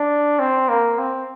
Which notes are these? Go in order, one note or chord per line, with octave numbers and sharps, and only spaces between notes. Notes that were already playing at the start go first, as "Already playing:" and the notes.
Already playing: D4
C4
A#3
C4